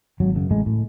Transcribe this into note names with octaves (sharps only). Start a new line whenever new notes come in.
G#1 F#3
F#2 C#3
A1 G#3
A2